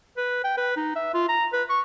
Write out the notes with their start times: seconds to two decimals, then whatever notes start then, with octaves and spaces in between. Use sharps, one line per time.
0.17 B4
0.44 G5
0.57 B4
0.77 D#4
0.96 E5
1.14 F4
1.29 A#5
1.53 B4
1.69 C#6